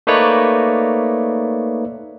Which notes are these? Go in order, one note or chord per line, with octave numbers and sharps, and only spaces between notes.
A3 A#3 D#4 B4 C#5 D5